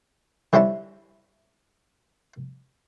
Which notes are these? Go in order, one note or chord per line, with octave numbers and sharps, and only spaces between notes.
D3 G3 C4 C#4 E4 A4